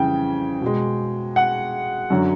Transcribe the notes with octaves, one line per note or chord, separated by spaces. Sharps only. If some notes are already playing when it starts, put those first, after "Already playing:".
Already playing: F2 C#3 E3 G3 G5
B2 G#3
F#5
F#2 D3 F#3